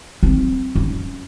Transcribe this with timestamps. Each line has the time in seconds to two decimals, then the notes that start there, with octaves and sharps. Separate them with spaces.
0.23 C4
0.75 C#4